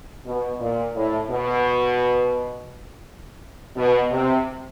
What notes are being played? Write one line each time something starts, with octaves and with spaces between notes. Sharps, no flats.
B2
A#2
A2
B2
B2
C3